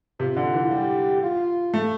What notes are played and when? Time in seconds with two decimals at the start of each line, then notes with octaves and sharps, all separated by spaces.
0.20 C3 F4
0.37 D3
0.54 E3
0.71 G3 G4
1.22 F4
1.74 A3